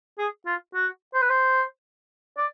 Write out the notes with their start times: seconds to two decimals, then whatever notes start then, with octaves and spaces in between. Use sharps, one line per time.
0.19 G#4
0.46 F4
0.74 F#4
1.14 C5
1.22 B4
1.30 C5
2.37 D5